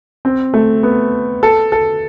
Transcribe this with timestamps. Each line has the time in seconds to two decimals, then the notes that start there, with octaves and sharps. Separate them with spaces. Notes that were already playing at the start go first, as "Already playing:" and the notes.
0.25 C4
0.54 A3
0.83 B3
1.43 A4
1.72 A4